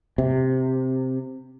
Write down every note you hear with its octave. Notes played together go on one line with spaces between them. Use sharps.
C3